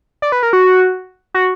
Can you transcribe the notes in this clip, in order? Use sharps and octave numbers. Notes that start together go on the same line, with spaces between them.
D5
B4
A#4
F#4
F#4